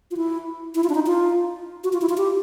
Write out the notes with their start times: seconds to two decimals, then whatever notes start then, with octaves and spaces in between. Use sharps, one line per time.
0.11 F4
0.17 E4
0.75 E4
0.84 F4
0.89 D4
0.95 D#4
1.07 F4
1.84 F#4
1.93 F4
2.01 E4
2.09 F4
2.17 G4